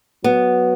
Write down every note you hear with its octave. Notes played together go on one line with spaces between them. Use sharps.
F#3 B3